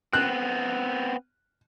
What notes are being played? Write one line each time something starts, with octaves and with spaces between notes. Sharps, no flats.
B3 C4 F#6